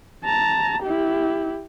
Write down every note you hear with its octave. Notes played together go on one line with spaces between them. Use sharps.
A5 A#5
E4 G4